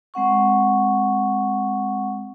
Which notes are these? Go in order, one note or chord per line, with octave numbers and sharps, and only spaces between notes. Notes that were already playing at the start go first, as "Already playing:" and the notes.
G#3 C4 F#5 C#6